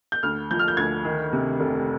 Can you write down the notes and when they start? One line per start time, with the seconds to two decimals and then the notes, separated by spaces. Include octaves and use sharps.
0.12 G6
0.23 D2 F6
0.51 F3 G6
0.59 F6
0.68 G6
0.77 D2 G#6
1.05 D#3
1.33 C3
1.60 F1